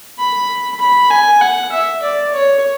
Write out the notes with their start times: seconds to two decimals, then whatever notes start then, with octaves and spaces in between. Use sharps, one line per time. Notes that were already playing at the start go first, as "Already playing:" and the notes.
0.19 B5
0.80 B5
1.10 G#5
1.41 F#5
1.72 E5
2.02 D5
2.33 C#5